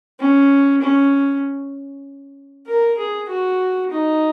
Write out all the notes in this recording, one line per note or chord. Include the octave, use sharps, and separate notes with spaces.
C#4
C#4
A#4
G#4
F#4
D#4